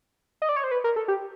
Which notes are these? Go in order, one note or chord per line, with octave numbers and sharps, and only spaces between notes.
D#5
D5
C#5
C5
B4
A#4
A4
G4